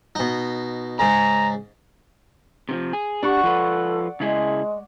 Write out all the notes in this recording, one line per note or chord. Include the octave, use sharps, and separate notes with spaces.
B2 D#4
G#2 C#3 A#5
C3 E3 F3
G#4
D4 G4 D5 F#5 C#6
F3 F4 A4 B4
C#3 G#3 E4 G#4